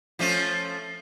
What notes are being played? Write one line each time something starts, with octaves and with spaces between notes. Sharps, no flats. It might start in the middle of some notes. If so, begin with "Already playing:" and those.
F3 A3 C#4